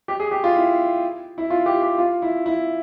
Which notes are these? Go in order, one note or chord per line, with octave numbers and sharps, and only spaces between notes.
G4
G#4
G4
F4
E4
E4
F4
G4
G4
F4
E4
E4